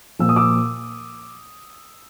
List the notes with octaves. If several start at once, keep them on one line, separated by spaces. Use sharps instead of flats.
A#2 F3 E6
D#6
D6 E6